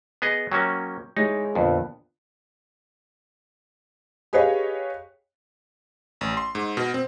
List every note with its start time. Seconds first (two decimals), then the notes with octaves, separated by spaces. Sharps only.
0.22 B3 G#4 D#5
0.52 F#3 A#3 C#4 G5
1.17 G#3 D#4 E4 C#5
1.55 F2 A#2 D3 B3
4.33 G4 G#4 B4 C#5 D#5 F5
6.21 A1
6.37 C6
6.55 G#2
6.77 B2
6.94 C4